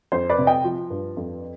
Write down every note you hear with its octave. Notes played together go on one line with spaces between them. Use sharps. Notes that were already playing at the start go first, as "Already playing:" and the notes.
F2 C5
B4 D5
C3
D#5 G5
F3
G2
F2